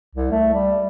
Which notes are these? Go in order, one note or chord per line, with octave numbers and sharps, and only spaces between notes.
C2
A3
G3